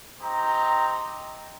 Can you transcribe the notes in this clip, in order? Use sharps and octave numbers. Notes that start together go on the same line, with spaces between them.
C4 D#4 G4 A#5